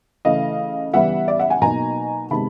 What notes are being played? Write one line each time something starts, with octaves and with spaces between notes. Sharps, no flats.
C#3 E3 A3 D#5 F5
C#3 E3 G3 B3 E4 E5 F#5
D5 E5
E5 F#5
F#5 G#5
B2 F#3 A#3 D#4 G#5 A#5
C3 D#3 G#3 B3 A5 B5